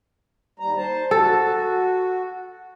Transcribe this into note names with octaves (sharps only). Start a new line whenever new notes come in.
D#2 G3 A#5
C5 A5
F#4 A4